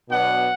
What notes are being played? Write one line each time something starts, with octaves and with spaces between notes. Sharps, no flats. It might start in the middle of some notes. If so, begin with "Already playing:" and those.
B2 F#3 B3 D4 F#5